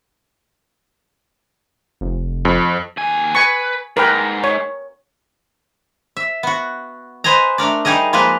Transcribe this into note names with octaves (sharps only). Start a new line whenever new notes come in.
F1
F2
D#2 G#5
B4 G#5 C#6
G#2 A#4 B4 G5
C#5
E5
B3 F#4
B4 C5 D#5 G#5 A#5
A3 D4 A#4 D5
G3 D#4 G4 G#4 A#4 D#5
F3 G#3 A#3 F4 B4 D#5